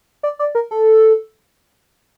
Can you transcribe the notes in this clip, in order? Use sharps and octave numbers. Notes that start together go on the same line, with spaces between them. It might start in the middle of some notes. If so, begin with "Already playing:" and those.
D5
D5
A#4
A4